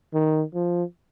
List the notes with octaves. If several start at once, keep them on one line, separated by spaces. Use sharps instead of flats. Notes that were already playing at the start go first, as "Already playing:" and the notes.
D#3
F3